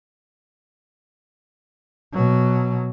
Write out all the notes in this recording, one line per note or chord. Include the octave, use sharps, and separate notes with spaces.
B2 F#3